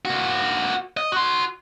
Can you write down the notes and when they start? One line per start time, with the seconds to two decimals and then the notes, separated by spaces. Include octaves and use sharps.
0.05 A#3 F#4
0.97 D#5
1.12 F#4 C6